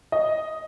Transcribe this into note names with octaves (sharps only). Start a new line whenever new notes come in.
D#5